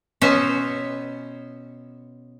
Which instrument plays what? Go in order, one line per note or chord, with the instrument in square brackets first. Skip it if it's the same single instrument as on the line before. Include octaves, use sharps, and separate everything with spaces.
[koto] B2 B3 C#4 C5 E5